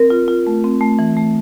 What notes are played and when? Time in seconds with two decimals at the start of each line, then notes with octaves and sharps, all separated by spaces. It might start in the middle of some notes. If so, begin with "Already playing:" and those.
Already playing: C4 A#4
0.10 F4
0.28 F4
0.47 A3
0.64 C4
0.81 A3
0.99 E3
1.17 A3